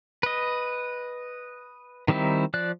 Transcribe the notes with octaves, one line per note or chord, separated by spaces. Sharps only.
B4 D#5
D#3 G3 C4 D#4 E4
F3 D5 F#6